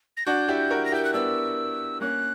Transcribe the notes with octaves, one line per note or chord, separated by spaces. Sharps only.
A#6
D4 F#4 G6
E4 G4
F#4 A#4
A#6
E4 G4 G6
F#6
B3 D4 E6
A#3 C#4 F#6